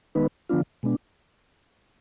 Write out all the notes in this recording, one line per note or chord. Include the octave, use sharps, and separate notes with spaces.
D#3 G#3 B3 D#4 B4
D3 F3 B3 D4 F4
B2 G#3 B3 D4